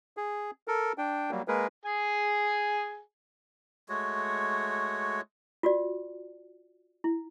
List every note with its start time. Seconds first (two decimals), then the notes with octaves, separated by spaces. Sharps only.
0.17 G#4
0.68 A4 A#4
0.98 D4 G5
1.31 F#3 G3 A#3
1.48 G#3 A#3 G#4 A#4 B4
1.85 G#4 G#5
3.89 G#3 A3 F#4 C#5
5.63 F4 F#4 D5
7.04 E4